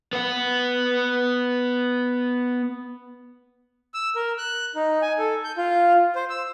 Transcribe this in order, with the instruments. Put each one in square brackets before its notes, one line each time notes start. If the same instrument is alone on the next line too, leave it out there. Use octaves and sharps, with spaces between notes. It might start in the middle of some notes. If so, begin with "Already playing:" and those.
[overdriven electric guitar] B3 F#5
[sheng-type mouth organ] E6
A#4
F#6
D#4
G#5
A4
G6
F4
C5
E6